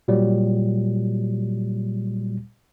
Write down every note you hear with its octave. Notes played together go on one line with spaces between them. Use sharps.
A#2 F#3 G3